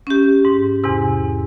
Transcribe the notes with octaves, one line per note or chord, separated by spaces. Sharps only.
C#4 G4
G#2
E2 G#2 C3